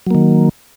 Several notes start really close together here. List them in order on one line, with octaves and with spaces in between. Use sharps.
F#3 A#3 D#3